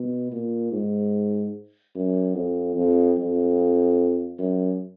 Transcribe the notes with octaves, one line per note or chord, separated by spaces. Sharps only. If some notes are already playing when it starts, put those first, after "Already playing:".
Already playing: B2
A#2
G#2
F#2
F2
F2
F2
F#2